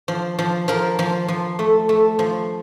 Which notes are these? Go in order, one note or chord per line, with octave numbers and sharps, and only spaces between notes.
F3
F3
F3 A#4
F3
F3
A3
A3
F3